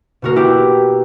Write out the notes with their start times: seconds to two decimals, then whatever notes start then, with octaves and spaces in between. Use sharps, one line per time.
0.22 B2 A#3 F#4 A#4
0.36 E4 G4